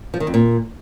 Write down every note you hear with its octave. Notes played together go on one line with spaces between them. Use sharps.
F3
D#3
F2
A#2